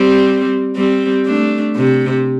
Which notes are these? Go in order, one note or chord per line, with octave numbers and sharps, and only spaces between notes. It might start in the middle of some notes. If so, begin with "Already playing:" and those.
Already playing: G3 C4
G3 C4
A3 D4
C3